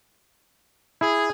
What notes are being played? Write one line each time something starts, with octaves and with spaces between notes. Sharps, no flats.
E4 G#4